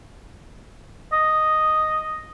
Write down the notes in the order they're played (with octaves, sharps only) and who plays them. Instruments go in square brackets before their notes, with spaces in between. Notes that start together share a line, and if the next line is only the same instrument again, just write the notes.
[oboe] D#5